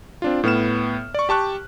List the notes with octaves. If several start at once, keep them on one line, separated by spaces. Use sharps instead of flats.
C4 D4 F4
A2 B3 F6 E7
D5 C#6
G4 A5 C#6 F#6